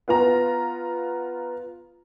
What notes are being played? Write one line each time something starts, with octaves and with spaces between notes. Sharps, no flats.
B3 F4 A#5